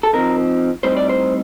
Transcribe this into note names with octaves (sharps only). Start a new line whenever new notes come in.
A4
F3 C4 D#4 A#4
A2 G3 C4 D#4 C5
D5
C5